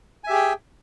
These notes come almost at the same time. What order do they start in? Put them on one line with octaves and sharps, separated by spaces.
G#5 E5 G4 G#4 G5